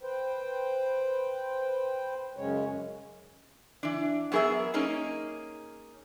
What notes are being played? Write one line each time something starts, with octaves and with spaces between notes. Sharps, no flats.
B4 C5 G5
F#2 C#3 G#3 C#4 C#5
E3 D4
F#3 B3 G#4 A#4 E5
A#3 C#4 D#4 G#4